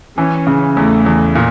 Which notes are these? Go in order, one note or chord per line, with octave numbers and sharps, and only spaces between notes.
E3 C#4
C#3
E2 A3
E2
A#2